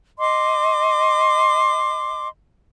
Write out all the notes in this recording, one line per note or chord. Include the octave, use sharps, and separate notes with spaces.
D#5 C6 D6